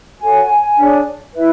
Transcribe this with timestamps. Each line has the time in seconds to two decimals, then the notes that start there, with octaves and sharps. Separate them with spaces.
0.20 F#4 A4 C#5 G#5
0.78 D4 G#4 C#5
1.36 E4 B4 E5